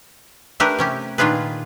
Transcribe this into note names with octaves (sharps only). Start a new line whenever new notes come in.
A3 D4 G4 A#4 B4
C3 C#4 G4
A#2 D#3 D4 F4 G#4 B4